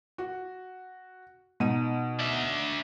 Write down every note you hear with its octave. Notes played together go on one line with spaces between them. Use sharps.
F#4
B2 D#4 D#7
D4 E5